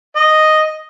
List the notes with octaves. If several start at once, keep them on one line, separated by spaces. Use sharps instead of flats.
D#5